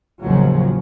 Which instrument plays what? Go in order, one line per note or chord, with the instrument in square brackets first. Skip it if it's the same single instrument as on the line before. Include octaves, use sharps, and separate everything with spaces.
[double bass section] A1 D#2 C#3 F3 F#3